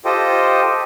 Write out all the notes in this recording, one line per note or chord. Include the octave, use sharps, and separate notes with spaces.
F4 G4 A4 C5 D#5 G5